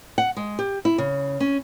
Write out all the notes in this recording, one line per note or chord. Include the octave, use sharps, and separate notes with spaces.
F#5
G#3
G4
E4
C#3
C#4